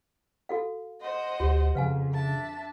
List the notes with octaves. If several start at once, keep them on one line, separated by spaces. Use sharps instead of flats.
F#4 A4 F5
C5 D#5 F#5
D2 F#4 G4
F2 C#3 B4 F5 G#5
D4 E5 A5